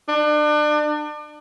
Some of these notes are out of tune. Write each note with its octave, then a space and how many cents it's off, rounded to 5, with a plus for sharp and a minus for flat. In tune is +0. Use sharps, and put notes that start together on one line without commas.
D4 +35